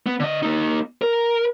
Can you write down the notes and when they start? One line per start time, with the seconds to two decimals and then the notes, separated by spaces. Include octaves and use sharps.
0.06 B3
0.20 D3 D#5
0.42 A#3 D#4
1.02 A#4